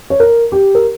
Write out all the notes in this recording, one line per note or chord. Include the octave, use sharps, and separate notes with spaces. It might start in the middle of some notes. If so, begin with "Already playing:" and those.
C#5
A#4
G4
A#4